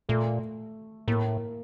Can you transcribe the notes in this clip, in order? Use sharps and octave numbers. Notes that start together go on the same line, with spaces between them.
A#2 A3 A4
A2 A#3 A#4